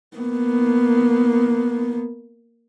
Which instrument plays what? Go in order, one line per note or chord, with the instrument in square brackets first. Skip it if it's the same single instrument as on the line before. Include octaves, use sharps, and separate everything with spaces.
[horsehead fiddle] A#3 B3